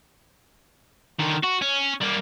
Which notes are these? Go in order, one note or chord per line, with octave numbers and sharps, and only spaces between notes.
D3 D#3
F#4
C#4
G3 A#3